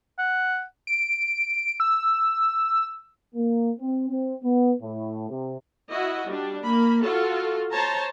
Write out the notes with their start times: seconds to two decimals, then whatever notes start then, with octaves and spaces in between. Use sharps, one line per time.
0.19 F#5
0.87 D7
1.80 E6
3.35 A#3
3.79 C4
4.09 C4
4.42 B3
4.81 A2
5.29 C3
5.90 E4 F#4 D#5
6.27 G3 D4
6.64 A#3 B5
7.02 F4 F#4 A4
7.73 C5 C#5 A5 A#5